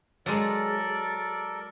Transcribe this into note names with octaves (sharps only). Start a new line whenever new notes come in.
F#3 G#3 A4 A#4 D5